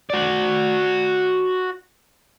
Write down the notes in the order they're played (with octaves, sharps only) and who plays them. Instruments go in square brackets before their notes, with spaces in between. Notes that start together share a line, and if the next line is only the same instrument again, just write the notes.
[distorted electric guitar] F#4 D5